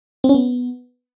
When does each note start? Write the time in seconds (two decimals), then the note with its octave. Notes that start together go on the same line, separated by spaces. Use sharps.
0.24 C4
0.29 C#4
0.34 B3